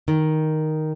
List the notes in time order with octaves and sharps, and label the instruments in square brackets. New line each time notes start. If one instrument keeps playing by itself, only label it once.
[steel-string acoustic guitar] D#3